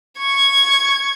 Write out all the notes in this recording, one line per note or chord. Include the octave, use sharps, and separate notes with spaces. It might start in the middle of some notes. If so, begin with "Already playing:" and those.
C#6 G#6